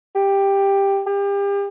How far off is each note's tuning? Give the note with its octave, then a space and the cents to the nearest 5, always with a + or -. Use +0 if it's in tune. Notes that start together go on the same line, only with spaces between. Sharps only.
G4 +10
G4 +35